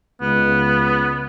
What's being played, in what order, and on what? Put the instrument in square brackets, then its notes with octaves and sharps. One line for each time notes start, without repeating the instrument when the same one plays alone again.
[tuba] C#2 [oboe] B3